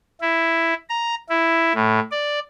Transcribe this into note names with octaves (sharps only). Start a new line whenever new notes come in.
E4
A#5
E4
A2
D5